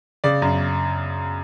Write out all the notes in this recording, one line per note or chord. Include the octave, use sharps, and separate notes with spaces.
C#3 D5
F#2